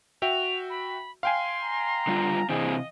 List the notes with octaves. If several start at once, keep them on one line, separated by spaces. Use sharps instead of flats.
F#4 E5 G5 F7
B5
F5 G5 G#5 C6
A#5
D3 G3 F4
C3 E3 C4 G#4 D#5